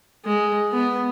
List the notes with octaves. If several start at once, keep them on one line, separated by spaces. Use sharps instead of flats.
G#3
B3